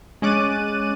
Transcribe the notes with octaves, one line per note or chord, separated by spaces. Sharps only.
G#3 C#4 D6 F#6 A6 D#7